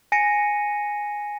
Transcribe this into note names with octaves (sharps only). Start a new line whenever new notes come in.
G#5 A#6 C#7 D#7